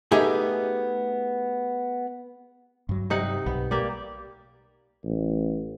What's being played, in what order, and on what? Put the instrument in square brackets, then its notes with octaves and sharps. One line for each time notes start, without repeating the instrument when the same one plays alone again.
[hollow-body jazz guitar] A3 B3 D#4 G4 G#4
[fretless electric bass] G2 F#3
[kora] C3 D#4 F#5
[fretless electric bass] B1 [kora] B3
[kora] A#3 G4 D5
[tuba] A1